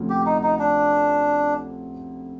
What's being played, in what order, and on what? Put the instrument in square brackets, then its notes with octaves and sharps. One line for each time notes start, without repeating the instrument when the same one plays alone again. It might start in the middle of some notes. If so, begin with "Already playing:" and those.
Already playing: [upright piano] D2 C3 F3 A3 C#4
[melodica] G4
D#4
D#4
D4